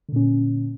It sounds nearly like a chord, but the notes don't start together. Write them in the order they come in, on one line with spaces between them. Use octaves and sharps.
D3 A#2 C#4